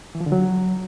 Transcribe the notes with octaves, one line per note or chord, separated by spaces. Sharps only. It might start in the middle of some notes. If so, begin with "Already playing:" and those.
E3
F3
D3
F#3